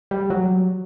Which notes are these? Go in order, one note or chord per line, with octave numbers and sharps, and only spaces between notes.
G3
F#3